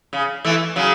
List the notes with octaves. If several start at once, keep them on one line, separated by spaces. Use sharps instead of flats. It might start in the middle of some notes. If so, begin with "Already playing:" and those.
C#3
E3 A3
C#3 F#3